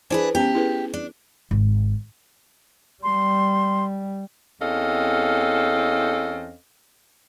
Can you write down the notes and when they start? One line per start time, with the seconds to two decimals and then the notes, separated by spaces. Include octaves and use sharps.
0.10 D4 E4 G#4 B4 C5
0.35 B3 C#4 G4 A5
0.55 E4 G#4 B4
0.94 D4
1.51 G#1
3.03 G3 C6
4.61 E2 C4 C#4 A4 D#5 F5